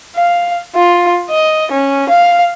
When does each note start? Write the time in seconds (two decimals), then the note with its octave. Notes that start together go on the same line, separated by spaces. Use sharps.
0.15 F5
0.75 F4
1.30 D#5
1.71 C#4
2.09 F5